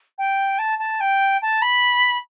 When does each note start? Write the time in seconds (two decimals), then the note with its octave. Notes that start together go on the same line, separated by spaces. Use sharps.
0.18 G5
0.59 A5
0.79 A5
1.00 G5
1.42 A5
1.62 B5